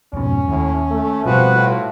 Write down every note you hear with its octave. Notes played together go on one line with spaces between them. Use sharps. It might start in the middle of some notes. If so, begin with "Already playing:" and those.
F2 G#2 B2 C#4
D#2 A2
A3
B2 F3 G3 C4 F#4 B4
A2 F4